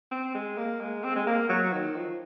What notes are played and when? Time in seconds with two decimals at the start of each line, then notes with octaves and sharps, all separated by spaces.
0.11 C4
0.34 G#3
0.58 A#3
0.80 G#3
1.04 C4
1.16 G#3
1.27 A#3
1.49 F#3
1.73 D#3
1.96 F3